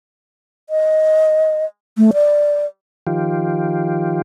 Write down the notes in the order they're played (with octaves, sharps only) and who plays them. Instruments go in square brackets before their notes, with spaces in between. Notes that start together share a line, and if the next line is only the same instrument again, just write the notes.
[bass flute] D#5
A3
D5
[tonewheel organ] D#3 F3 F4 G4